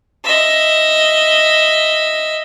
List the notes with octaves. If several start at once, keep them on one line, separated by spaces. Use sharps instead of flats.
D#5 E5